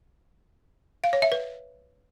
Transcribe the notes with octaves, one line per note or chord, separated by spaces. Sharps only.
F5
C#5
E5
B4